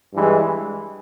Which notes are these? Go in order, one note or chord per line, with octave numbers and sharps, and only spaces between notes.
G2 E3 G#3